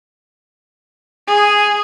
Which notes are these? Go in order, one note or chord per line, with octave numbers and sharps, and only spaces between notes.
G#4